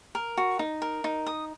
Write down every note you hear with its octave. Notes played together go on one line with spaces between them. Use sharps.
A#4
F#4
D#4
A#4
D#4
D#6